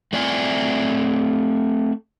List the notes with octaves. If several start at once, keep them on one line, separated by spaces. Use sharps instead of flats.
A3 C4 D5 E5 G#5